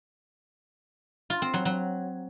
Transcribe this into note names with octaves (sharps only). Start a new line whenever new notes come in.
F4
C4
F#3
F#3